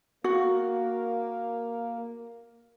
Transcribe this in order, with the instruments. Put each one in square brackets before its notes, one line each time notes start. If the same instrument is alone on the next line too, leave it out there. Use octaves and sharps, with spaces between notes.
[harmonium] A#3 [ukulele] F#4